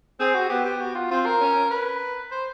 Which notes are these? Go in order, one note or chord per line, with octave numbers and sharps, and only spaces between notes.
C4 G#4
F#4
B3 G4
G4
F#4
F4
C4 F4
A#4
C#4
B4
C5